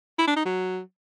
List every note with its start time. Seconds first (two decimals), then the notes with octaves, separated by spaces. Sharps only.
0.19 E4
0.27 D4
0.36 D#4
0.45 F#3